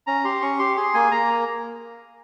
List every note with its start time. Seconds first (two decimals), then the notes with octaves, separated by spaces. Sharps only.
0.07 C#4 A#5
0.24 G4 C6
0.42 C#4 C#6
0.59 G4 C6
0.77 G#4 C6
0.94 A#3 G#5
1.12 A#3 A#5